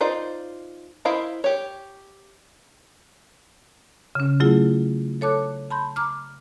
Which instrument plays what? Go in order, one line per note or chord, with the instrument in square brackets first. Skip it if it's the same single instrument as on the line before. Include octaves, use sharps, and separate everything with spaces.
[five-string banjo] D#4 F4 C5 D5 D#5
E4 A#4 C5 D#5 F5
G4 C#5
[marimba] C#3 C#4
F#3 A3 E4 F4 G#4
A4 C#5 A5 D6 F#6
A5 B5 C6 G6
A#5 D6 F6